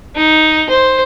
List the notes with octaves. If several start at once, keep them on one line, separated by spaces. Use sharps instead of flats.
D#4
C5